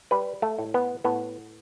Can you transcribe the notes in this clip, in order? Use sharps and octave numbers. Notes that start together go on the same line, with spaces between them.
G3 B4
A3
A2
B3
A2 B3